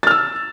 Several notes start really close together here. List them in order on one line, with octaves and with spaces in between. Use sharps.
A6 F6 E6